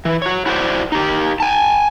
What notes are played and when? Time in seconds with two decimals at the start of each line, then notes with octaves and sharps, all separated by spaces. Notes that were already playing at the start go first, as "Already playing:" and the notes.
0.05 E3
0.22 F#4 C#5
0.46 E4 F#4 A4 C5 D5
0.92 D#4 G4
1.40 G#5 A5